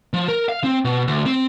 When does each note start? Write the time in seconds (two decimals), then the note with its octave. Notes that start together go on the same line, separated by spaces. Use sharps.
0.13 F3
0.28 A#4
0.49 F5
0.64 C4
0.85 B2
1.08 D2
1.26 C4